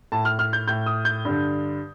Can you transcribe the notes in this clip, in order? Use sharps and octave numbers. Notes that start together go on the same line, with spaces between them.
A2 A5
F6
F6
G6
A2 G6
D#6
G6
G2 D3